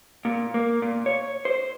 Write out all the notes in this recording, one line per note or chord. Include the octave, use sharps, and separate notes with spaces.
A#2
A#3
A#2
C#5
C5